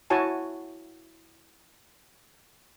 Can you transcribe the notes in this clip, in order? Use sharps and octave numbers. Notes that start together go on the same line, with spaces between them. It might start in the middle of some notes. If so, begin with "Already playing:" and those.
E4 F#4 C#5 G#5 A5